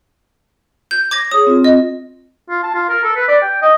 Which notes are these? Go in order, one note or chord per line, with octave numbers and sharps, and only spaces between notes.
G6
D6 G#6 A#6
G#4 C#5 D#6
C4 F4
D#5
F4
A5
F4
A#4
A4
B4
D5
G5
D#5